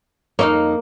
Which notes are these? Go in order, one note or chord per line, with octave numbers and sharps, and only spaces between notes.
F2 A#3 D#4 C#5 F5